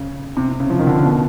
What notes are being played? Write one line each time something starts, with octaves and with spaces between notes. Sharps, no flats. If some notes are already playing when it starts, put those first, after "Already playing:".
Already playing: C#3
C3
C3
C#3
F3
D#3
D3
C#3
B2